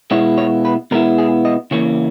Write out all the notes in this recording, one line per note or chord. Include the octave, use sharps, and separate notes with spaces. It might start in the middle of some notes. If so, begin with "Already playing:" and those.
B2 G#3 B3 E4 C#5
C#5
B4
B2 G#3 B3 E4 A#4
G#4
D#5
C#3 E3 A#3 C#4 C#5